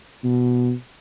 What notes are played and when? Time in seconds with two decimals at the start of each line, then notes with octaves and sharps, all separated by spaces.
0.24 B2